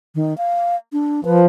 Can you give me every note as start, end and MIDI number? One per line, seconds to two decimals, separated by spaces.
0.15 0.36 51
0.38 0.76 77
0.93 1.21 62
1.25 1.46 53
1.25 1.40 71